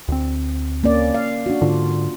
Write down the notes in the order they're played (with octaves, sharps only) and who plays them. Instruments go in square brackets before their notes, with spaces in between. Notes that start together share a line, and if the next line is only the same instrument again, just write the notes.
[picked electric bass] D2 C4
[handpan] A#3 C#4 D5
F5
D4 F#4
[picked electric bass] G#2 D3 [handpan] F4